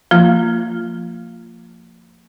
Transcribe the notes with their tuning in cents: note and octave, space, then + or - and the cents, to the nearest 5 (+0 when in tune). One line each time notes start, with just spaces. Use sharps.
F3 +0 A#3 -25 F4 -10